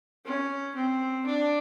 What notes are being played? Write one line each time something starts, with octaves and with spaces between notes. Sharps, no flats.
C#4
C4
D4